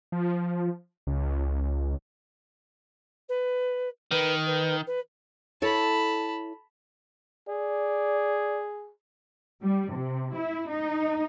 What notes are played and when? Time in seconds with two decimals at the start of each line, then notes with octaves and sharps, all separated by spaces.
0.12 F3
1.07 C#2
3.28 B4
4.11 D#3 B4
4.46 B4
4.87 B4
5.62 E4 A4 C#5 A5 B5
7.49 G#4 D5
9.62 G3
9.92 C3
10.34 E4
10.70 D#4